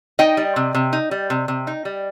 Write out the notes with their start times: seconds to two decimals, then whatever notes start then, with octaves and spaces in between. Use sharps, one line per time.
0.19 D#4 D#5 G5
0.37 G3
0.56 C3
0.75 C3
0.93 D#4
1.11 G3
1.30 C3
1.48 C3
1.67 D#4
1.85 G3